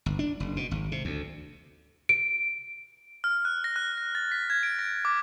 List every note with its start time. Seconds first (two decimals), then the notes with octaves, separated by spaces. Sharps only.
0.06 G1
0.19 D4
0.40 F#1
0.57 B2
0.71 G#1
0.92 C3
1.05 D2
2.09 D7
3.24 F6
3.45 F#6
3.64 A#6
3.76 F#6
3.97 A#6
4.15 A6
4.32 B6
4.50 G#6
4.63 D7
4.79 A#6
5.05 D6